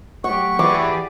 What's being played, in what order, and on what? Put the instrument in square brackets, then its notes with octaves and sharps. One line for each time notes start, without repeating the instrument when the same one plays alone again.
[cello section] F#3 A3 G4 [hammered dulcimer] F#5 [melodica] C#6
[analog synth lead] E3 [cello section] G4 G#4 D5 [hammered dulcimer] D6